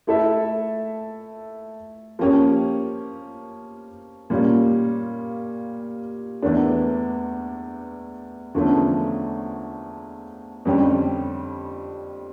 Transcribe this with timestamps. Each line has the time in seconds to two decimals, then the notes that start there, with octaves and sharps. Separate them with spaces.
0.07 A3 E4 A4 E5
2.19 F3 A#3 C#4 G4 C#5
4.30 A#2 G3 A#3 C#4 F4
6.42 E2 E3 A3 D4
8.54 E2 D3 F3 A3 C#4
10.65 F2 D3 G3 C#4 G4